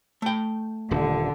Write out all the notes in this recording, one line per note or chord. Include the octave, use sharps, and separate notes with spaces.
A3 G5
D#1 D3